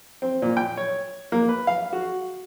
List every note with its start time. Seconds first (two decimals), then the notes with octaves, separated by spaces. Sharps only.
0.22 C4
0.42 A#2
0.57 G5
0.77 C#5
1.32 A#3
1.49 B4
1.67 F5
1.93 F#4